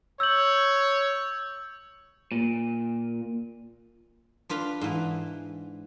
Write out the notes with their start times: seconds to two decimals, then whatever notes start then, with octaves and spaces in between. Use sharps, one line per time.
0.20 C#5 E6 G6 F#7
2.32 A#2
4.49 D4 F4 B4
4.81 G#2 E3